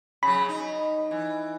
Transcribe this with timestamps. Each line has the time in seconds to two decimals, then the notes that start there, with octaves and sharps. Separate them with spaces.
0.23 C#3 F#3 B5
0.48 D#4
1.11 E3